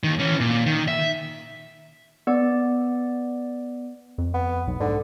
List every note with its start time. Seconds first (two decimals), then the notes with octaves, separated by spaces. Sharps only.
0.03 D#2 D#3
0.20 E3 C#4
0.40 A#2
0.66 D#3
0.88 E5
2.27 B3 D5
4.18 F2
4.34 B3
4.68 B1
4.80 G#2 D3